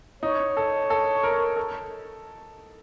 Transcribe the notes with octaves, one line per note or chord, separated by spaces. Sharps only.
D#4 C#5
A4
A4
A#4
A4